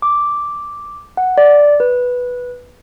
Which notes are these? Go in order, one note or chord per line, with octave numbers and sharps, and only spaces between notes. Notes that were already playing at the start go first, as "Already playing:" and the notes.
D6
F#5
D5
B4